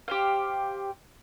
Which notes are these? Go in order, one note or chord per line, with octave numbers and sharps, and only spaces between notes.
G4 C5 F5